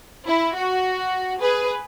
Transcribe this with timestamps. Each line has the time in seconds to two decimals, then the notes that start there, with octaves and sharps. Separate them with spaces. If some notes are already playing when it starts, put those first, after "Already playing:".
0.27 E4
0.55 F#4
1.41 G#4 B4